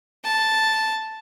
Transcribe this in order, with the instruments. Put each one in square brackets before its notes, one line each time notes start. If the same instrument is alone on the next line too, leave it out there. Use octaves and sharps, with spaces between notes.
[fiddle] A5